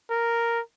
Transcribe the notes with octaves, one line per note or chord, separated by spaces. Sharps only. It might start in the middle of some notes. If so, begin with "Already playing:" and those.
A#4